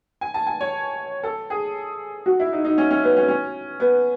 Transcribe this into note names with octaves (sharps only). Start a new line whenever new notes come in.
G#5
A5
G#5
C#5
A4
G#4
F#4
E4
D#4
D#4
C#4
C#4
B3
C#4
C#4
B3